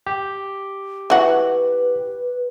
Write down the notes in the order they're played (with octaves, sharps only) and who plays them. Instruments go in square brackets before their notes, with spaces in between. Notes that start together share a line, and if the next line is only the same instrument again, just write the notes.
[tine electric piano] G4
[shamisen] E3 F#4 [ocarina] B4